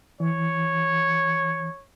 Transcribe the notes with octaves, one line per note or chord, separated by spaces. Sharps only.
E3 C#5